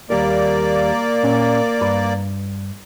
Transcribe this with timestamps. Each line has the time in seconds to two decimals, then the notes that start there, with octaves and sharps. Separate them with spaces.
0.10 D#2 G3 A#3 A#4 D5
1.23 A#2 C#4
1.81 G2 B4 B5